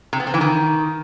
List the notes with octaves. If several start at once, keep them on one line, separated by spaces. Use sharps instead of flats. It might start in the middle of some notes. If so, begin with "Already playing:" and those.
C3
B3
C4
E3
D#3